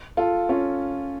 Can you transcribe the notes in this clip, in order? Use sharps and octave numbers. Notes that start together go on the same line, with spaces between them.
F4 A4
C#4 F4